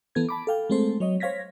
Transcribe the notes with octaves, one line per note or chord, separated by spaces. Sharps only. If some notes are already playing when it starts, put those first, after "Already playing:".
E3 B3 A4 G#6
A5 B5 D6
A4 F5 G5
G#3 A3 C4 A4 C5
F#3 C#5 D#5
C5 C#5 F5 G#6 A#6 B6